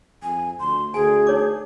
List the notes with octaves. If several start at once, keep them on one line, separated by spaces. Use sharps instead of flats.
F2 G#5
D2 C6
D2 G#4 G#5
D#4 C#5 D6